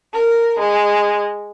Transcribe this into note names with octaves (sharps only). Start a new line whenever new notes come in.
A#4
G#3